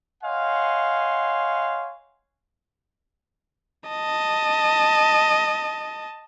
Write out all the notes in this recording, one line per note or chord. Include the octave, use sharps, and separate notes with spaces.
C#5 D#5 F5 F#5 G#5 C6
D#5 A5